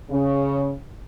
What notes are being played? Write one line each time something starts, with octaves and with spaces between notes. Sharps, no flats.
C#3